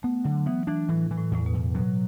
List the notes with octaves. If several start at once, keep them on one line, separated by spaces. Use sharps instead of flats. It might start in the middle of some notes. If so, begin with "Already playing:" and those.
A3 B3
D3 F#3
E3 B3
E3 D4
A2 E3
E3
A2
E2 A2
B2
E2
B2 F#3